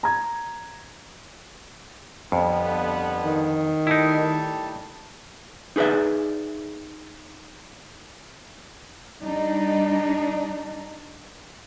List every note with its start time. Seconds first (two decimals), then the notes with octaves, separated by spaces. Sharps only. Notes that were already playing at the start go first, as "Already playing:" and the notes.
0.03 A#5 G#6
2.32 F2 D3 G3 B3
3.23 D#3
3.87 G3 A3 D#4 E4 A5
5.76 D#4 G#4 B4 D5 E5
9.23 G3 D4 D#4